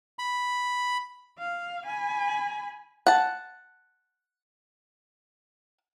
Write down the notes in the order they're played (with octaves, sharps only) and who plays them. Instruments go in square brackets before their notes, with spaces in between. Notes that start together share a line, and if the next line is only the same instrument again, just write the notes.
[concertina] B5
[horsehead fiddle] F5
G#5 B5
[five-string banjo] F#5 A5